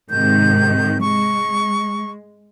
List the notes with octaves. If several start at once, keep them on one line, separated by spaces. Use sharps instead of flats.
G#2 C3 D#3 G6
G#3 C#6